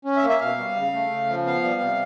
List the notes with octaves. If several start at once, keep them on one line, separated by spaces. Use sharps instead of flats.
C#4
E5
A#3
E5
B2 F5
G3
C#3
A3
C#3
F3
B3 F5
G3
C3